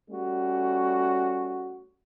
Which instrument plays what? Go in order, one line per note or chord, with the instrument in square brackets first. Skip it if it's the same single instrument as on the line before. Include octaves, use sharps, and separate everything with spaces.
[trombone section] G3 A3 C#4 F#4